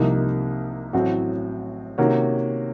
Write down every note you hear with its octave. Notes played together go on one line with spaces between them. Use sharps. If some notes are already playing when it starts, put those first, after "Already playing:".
Already playing: C2 C3 F3 A#3 D#4
A1 A2 F#3 C4 F#4
C3 D#3 A#3 C#4 F#4